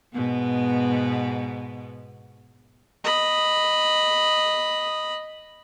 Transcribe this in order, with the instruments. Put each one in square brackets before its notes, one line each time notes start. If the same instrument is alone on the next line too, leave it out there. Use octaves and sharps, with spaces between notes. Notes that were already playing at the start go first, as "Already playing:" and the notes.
[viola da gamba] G#2 B2 B3
[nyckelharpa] D#5 B5